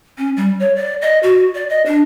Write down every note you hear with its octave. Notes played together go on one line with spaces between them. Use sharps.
C#4
G3
C#5
D5
D#5
F#4
D5
D#5
D4